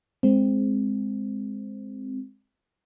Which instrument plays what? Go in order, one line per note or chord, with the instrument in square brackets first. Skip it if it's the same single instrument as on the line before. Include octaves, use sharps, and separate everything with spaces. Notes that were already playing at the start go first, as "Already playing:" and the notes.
[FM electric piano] G#3 C4